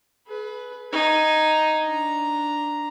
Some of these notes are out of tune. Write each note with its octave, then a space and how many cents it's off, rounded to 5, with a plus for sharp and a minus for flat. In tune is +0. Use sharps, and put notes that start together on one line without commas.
G#4 +45 B4 +0
D#4 +0 G#5 +0
D4 +0 A#5 +0